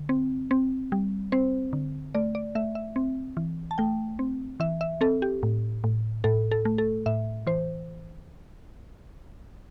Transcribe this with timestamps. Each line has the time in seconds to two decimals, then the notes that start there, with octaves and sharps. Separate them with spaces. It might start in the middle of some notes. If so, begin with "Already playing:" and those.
Already playing: D3
0.09 C4
0.51 C4
0.92 G3
1.32 C4 C5
1.73 D3
2.15 A3 D5
2.35 D5
2.55 A3 E5
2.75 E5
2.96 C4
3.37 E3
3.71 A5
3.78 A3 G5
4.19 C4
4.60 E3 E5
4.81 E5
5.01 C4 A4
5.22 G4
5.43 A2
5.84 A2
6.24 A2 A4
6.51 A4
6.65 A3
6.78 A4
7.06 A2 E5
7.47 E3 C5